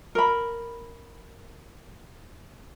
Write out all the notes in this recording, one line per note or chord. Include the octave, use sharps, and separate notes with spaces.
A#4 B5